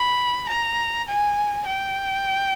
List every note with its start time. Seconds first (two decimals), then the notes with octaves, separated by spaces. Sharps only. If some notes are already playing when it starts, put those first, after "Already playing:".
Already playing: B5
0.49 A#5
1.08 G#5
1.67 G5